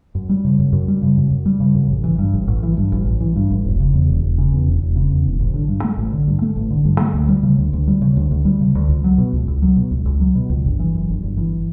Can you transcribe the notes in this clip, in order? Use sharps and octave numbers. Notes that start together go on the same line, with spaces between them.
F#2
G3
C#3
F#2
F#2
G3
C#3
F#2
F#2
G3
C#3
F#2
A1
E3
G2
A1
A1
E3
G2
A1
A1
E3
G2
A1
E1
C#3
E2
E1
E1
C#3
E2
E1
E1
C#3
E2
E1
A1
D3
G2
A3
A1
D3
G2
A3
A1
D3
G2
A3
D2
G3
C#3
D2
D2
G3
C#3
D2
D2
G3
C#3
D2
C#2
F#3
B2
C#2
C#2
F#3
B2
C#2
C#2
F#3
B2
C#2
G1
E3
F#2
G1
G1
E3